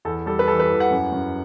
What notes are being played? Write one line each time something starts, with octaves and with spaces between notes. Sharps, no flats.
E2 A4
G3 A4
B4
E3 A4
B4
E2
F#5
F#2
F#2